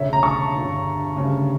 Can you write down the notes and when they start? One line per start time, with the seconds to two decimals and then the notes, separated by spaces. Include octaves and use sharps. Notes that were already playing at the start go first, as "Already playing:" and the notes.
Already playing: E1 D2 C#3 C#5 E5
0.13 A#5
0.23 A5 C#6
0.54 G1 G2 D3
1.16 D2 C#3 G3